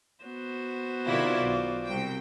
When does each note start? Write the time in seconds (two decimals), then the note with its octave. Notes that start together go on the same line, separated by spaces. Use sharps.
0.24 B3 F#4 C5
1.06 C3 D#3 E4 F4 D5
1.42 B1
1.85 C2 G5